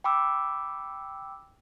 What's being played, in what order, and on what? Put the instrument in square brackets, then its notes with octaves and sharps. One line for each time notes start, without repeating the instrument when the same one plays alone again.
[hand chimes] G5 B5 D6 E6